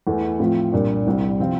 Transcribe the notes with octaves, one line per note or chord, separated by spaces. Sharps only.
E2 E3 A3
A2 F3 C4 F4
C2 A#2 G3 D4
C2 C3 G3 C4 E4
C3 F3 C4 F4